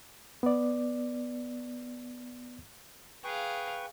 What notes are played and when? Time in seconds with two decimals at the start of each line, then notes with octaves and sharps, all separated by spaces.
0.43 B3 D5
3.24 G#4 B4 F5 G5 C#6